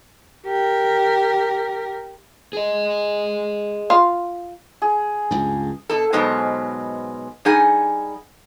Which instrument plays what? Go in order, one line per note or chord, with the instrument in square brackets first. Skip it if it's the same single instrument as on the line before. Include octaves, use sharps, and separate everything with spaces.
[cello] G4 A#4
[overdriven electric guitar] G#4 D#5
[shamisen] F4
[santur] G#4
[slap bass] C#2 G2
[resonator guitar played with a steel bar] B2 A4
G#2 B2 F#3 G#3 B3 C5
G3 D#4 G#4 F#5 G#5